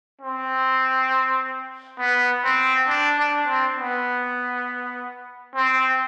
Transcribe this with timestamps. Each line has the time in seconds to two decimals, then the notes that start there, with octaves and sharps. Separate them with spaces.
0.21 C4
1.99 B3
2.44 C4
2.88 D4
3.18 D4
3.48 C4
3.77 B3
5.55 C4